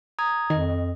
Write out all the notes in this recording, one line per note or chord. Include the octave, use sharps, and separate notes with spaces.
A#5 D#6 G#6
F2 D#3 D#5